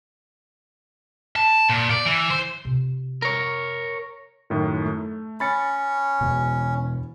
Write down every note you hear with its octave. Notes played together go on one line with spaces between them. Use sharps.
A5
A#2
D5
E3
C5
C3 F4
A#4 C#5
F#2 A2 D#3
A3
C#4 B5 A6 C#7
E2 B2